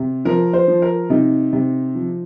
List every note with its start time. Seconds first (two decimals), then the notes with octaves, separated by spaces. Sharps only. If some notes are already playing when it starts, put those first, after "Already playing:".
Already playing: C3
0.25 F3 A#4
0.53 C5
0.68 F3
0.82 A#4
1.10 C3 D#4
1.53 C3
1.95 F3